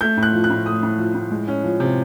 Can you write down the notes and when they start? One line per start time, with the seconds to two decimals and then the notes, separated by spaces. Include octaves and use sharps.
0.01 A3 G6
0.17 A2
0.23 F#6
0.33 F3
0.44 F#6
0.50 A2
0.65 A3 D#6
0.83 A2
0.98 F3
1.14 A2
1.31 G#3
1.48 C#4
1.64 F3
1.80 C3